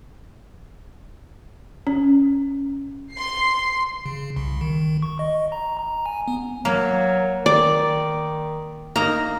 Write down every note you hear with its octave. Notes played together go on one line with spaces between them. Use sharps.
C#4
C6 C7
C#3
C2
D#3
C#6
D#5
A#5
A#5
G#5
B3
F#3 A#3
D#3 D5
A#3 D#4 A#5